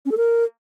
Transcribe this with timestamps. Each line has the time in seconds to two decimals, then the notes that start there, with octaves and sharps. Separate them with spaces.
0.06 C#4
0.11 A4
0.17 A#4